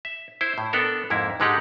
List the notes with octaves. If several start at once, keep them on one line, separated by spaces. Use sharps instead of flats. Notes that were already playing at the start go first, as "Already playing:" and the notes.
E5
E4 C5
A2
B3 D4 A4 A#4
F2 G#2 A#3 E4
G#2 D3 G#3 D#4 G4 F#5